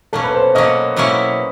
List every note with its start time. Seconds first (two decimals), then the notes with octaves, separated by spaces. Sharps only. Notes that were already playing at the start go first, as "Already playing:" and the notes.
0.13 B2 F#3 A#3 C#4 A4
0.23 B4
0.34 C5
0.55 B2 F#3 A#3 C#4 D#5
0.96 B2 F#3 A#3 C#4 E4